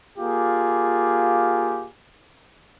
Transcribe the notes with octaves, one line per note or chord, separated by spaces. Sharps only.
A#3 F4 G4 G#4